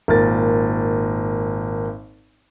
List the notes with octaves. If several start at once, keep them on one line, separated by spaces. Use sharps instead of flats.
G#1 A#2 A#4 A6